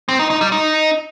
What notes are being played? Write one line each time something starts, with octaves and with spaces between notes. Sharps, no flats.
C4
D#4
D#4
G3
D#4